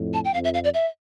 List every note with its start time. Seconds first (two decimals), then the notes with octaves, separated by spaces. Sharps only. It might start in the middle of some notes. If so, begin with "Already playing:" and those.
Already playing: F2 A2
0.14 A5
0.25 G5
0.33 F2 F5
0.44 E5
0.54 F5
0.64 D5
0.74 E5